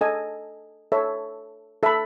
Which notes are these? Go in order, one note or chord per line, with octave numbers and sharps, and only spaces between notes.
A4 D#5 G#5
A4 C#5 E5
A4 E5 B5